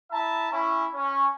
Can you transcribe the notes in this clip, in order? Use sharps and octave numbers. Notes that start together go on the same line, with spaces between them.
E4 E5 A5 A#5
C#4 E4
C#4